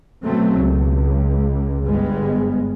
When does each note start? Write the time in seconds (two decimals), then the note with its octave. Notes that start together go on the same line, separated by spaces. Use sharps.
0.23 B2 F#3 A3 C4
0.55 C#2
1.85 G1 G3 G#3 B3